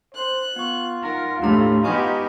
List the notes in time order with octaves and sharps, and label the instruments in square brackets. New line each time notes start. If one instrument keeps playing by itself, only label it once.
[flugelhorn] C5 [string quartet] F#6
[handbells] B3 C#6 [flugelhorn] F4
[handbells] D#4 F#5 [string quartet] A#4
[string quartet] D#2 [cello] A2 A3 [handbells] D4 G4 A#5
[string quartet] G#3 B3 [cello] D#4 G4 [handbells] G#5 C#6 F6